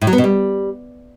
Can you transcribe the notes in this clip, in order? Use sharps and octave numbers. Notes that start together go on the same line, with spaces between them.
A2
F#3
B3
B2
G3